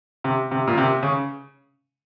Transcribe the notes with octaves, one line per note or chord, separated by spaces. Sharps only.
C3
C3
A#2
C3
C#3